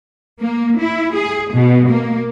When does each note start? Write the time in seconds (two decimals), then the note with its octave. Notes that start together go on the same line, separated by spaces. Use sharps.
0.41 A#3
0.79 E4
1.14 G#4
1.53 B2
1.89 A#3